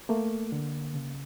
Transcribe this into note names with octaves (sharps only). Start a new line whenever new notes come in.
A3 A#3
D3
C#3